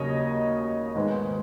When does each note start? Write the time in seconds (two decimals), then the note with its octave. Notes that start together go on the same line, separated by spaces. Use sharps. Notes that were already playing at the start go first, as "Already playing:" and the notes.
Already playing: D#2 C#3 F#3 C#5 D#5
0.95 G#2 D#3 G#3 B3